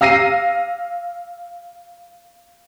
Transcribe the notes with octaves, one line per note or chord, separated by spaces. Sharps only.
F5 E6 A#6 C7 D#7